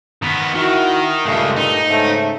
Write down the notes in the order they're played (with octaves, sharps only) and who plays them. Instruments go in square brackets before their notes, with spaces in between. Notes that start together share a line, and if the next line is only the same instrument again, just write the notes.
[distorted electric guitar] D#3 B3
[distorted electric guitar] D#3 [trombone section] E4 F#4
[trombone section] G2 A#2 A3 [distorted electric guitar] C#3 G#3
[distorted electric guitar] D#4
[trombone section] G#2 C#3 A3